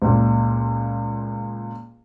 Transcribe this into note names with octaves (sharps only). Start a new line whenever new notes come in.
C#2 A#2